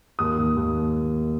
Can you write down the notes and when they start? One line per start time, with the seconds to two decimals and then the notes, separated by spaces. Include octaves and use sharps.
0.19 D#2 D#6
0.38 D#2
0.56 D#2